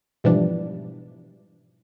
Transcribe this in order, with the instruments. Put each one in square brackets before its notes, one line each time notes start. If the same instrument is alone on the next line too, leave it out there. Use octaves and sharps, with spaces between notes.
[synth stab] G#2 B2 E3 F3 G3 D4